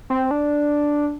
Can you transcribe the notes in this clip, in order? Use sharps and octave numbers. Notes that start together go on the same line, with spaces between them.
C4
D4